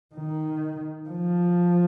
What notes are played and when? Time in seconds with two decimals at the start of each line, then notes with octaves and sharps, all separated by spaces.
0.15 D#3
1.09 F3